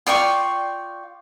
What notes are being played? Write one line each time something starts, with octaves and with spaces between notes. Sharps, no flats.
F4 D5 G5 C#6